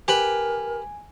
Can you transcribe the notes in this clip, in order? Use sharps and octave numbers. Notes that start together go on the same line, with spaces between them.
G4 A#4 B4 G#5 B5